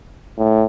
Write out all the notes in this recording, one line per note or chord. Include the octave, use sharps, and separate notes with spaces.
A2